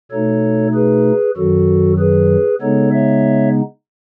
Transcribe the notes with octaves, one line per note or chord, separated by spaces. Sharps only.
B2 A3 D#4 A4 C#5
G#4 B4
F#2 D#3 F#3 F#4 A4
G#4 B4
C#3 G#3 B3 D#4 A4 C#5
C#5 E5